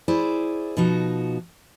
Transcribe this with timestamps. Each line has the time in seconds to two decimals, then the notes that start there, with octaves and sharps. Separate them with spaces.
0.08 E4 G#4 C5 D5
0.77 B2 F3 D#4 F#4